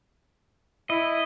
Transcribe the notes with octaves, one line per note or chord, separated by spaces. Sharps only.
E4 D#5